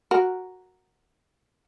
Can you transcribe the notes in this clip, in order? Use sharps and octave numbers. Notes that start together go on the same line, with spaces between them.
F#4 A#4